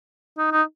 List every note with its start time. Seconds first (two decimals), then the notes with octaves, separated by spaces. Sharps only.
0.38 D#4
0.52 D#4